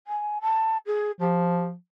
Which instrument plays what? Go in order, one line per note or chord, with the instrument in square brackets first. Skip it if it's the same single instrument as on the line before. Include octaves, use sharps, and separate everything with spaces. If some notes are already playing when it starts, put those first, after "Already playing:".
[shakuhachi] G#5
A5
G#4
[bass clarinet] F3 [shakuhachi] G4